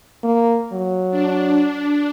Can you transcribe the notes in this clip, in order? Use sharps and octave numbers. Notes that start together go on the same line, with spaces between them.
A#3
F#3
D4